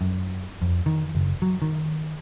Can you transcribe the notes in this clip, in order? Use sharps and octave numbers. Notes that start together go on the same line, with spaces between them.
F#2
F2
D#3
F#1
F#3
D#3